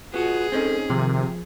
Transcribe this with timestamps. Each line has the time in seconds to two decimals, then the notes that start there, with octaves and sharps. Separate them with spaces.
0.14 B3 F4 F#4 G#4
0.52 C4 C#4 D#4 A4
0.90 C3 D#3 F3